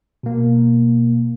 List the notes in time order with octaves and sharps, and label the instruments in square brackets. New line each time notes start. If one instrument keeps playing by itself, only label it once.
[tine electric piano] B2 A#3